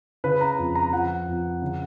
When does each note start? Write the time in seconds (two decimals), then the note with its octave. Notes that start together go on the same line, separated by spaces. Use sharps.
0.24 C#3 B4
0.41 A#5
0.58 F2
0.75 A#5
0.93 F3 F#5
1.27 F2
1.62 C#3